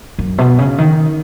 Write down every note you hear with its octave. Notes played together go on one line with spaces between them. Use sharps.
F#2
B2
C#3
D#3